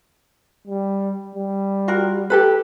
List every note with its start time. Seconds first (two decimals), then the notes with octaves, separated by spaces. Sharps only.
0.67 G3
1.35 G3
1.88 F4 F#4 A#4
2.30 G4 A4 B4